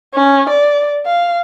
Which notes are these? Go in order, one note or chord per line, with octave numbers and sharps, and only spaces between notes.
C#4
D5
F5